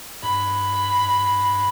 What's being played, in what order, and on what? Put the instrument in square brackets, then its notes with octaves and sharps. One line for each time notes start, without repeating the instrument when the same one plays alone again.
[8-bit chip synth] G2 [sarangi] B5